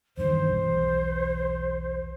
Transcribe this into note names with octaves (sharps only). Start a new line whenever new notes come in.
E2 G2 D#3 C5
B1 E2